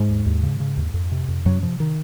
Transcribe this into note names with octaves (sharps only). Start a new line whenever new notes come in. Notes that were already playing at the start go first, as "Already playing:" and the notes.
Already playing: G#2 G#3
D#2
D#2
C#3
C#3
D#2
F2
C3
F2
F#2 C3 F#3
C3 F3
D#3